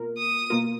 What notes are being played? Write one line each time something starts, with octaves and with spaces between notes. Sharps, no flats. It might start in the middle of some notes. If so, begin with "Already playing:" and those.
Already playing: B2 A#3 F4 A#4
D#6
B2 A#3 F4 A#4